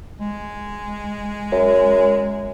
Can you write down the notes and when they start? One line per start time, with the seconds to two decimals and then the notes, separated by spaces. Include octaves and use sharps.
0.20 G#3
1.52 F#2